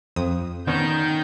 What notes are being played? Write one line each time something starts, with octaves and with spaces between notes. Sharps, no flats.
F2 D#6
D3 D#3 B3 C#4 G6